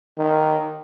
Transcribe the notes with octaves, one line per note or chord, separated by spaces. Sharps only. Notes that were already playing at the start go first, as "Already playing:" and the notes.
D#3